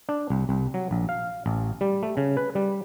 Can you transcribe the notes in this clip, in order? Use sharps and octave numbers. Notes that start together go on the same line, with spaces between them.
D4
C2
C2
F#3
A#1
F5
A1
G3
A3
C#3
B4
G3